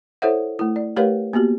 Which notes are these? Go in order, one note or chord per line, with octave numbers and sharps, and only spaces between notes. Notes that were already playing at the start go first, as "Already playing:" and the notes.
E4 A4 C5 C#5 E5 F#5
A3 E4
D5
A3 G4 A#4 B4 C#5 F5
A#3 B3 F#4 G4